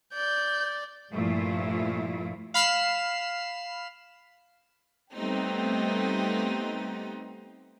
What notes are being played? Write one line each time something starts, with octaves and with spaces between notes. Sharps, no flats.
D5 G6
G2 A#2 F3 A3 E4 F4
F5 B5 F6 C7 E7
G3 A3 B3 C4 D#4 G4